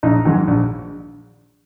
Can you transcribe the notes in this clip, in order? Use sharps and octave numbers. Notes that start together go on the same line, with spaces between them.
A#1 D#4
G#2 D#3 F#3
A#1